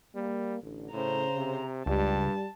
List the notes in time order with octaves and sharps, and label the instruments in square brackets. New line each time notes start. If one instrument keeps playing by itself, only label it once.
[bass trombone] G3 [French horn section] A#3
[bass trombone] A1 [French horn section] D3
[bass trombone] A2 [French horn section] C#3 [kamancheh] C5 A#5
[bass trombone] C3
[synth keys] C#2 [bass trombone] G2 [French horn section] G3 [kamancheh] A5